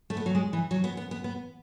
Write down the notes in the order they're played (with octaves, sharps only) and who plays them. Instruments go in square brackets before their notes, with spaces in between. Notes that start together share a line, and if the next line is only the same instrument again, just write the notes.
[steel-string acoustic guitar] A3
B3
F#3
G#3
E3
F#3
B3
B3
B3
B3